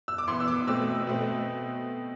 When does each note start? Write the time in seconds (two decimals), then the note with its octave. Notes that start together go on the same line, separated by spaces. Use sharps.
0.08 E6
0.18 D6
0.28 E3 B3 C6
0.40 E6
0.48 D6
0.67 B2 A3 C4 E6
1.07 B2 A3 C4